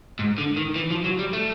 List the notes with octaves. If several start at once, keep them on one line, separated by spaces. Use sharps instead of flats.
G#2
D3
D#3
E3
F3
F#3
G3
A3